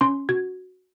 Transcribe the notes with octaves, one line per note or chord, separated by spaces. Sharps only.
C#4 C6
F#4 G#6